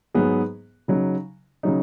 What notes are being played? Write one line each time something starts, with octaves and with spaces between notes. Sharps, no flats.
G#2 F#3 B3 G#4
C#3 F#3 D#4
C#3 F#3 D#4